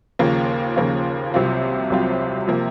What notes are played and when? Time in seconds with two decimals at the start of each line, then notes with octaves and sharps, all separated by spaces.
0.19 D#2 C#3 F3 A#3 F4
0.76 D#2 C#3 F3 A#3 F4
1.34 C2 C3 F#3 C4 F4
1.90 C2 C3 F#3 C4 F4
2.48 C3 F3 A#3